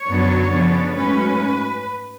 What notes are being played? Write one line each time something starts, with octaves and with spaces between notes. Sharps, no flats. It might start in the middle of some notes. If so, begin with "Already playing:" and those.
Already playing: C#5
F#2 D3 F#3 B3 D4
C#3 F3 B3 D4
G#2 F#3 A3 C#4 B4